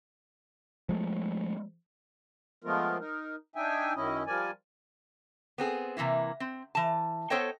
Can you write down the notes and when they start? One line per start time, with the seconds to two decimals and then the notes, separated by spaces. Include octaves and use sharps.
0.89 F3 G#3 A3
2.64 F3 G#3 A3 B3 F4 A#4
2.99 D#4 A#4
3.56 D4 D#4 E5 G5 G#5
3.96 F#2 D#3 C#4 E4 D#5
4.27 F3 G3 A#4 D5 G#5
5.58 B3 C4 G#4
5.97 C3 E3 A#3 E4
6.40 C4
6.75 E3 A5
7.30 B3 A4 C5 C#5 D#5 G5